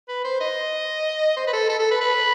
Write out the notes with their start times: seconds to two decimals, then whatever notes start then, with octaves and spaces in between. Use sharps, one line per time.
0.09 B4
0.24 C5
0.41 D#5
1.37 C5
1.47 B4
1.53 A4
1.69 A4
1.80 A4
1.91 B4
2.01 B4